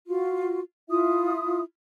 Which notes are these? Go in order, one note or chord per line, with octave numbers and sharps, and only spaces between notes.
F4 F#4
E4 F4 E5 D#6